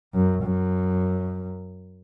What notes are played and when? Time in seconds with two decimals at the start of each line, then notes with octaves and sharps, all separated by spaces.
0.14 F#2
0.44 F#2